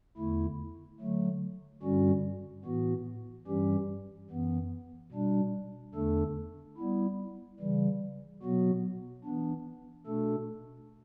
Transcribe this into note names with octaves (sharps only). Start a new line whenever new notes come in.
E2 D3 A3 E4
D3 F#3 A3
G2 D3 G3 C#4 F#4
A2 E3 B3 F#4
G2 E3 G3 C#4 G4
F#2 E3 B3
B2 G3 D4
E2 D3 A3 D4 A4
G3 B3 E4
C#3 E3 G3
B2 F#3 B3 F#4
E3 B3 D4
B2 A3 D4 A4